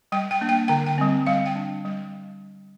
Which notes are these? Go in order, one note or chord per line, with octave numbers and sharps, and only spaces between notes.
G3 G5
G5
A#3 D4
G5
D3 G5
G5
G3 C4
G3 F5
G5
D4
G3